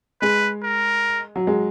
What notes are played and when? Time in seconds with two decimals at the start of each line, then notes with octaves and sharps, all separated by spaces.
0.21 G#3 B4
0.63 A#4
1.36 F#3
1.47 G#3